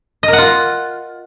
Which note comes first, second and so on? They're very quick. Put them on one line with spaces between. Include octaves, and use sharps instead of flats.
D#5 A#4 F#5 F4